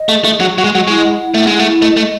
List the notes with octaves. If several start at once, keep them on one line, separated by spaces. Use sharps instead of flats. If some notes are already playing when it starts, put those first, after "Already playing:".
Already playing: D#5
A3 G#4
A3 G#4
F#3 G#4
F#3 C#6
G#3
F#3 D#5
G#3 E4
F#5
E4
A3 F#5
G#3 E4
A3
E4
A3 D#5
A3 D#5